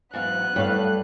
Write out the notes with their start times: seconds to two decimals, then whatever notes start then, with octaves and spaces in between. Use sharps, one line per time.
0.14 E2 G#2 F#3 B3 F5 F#6
0.56 G2 A3 A4 C#5 F5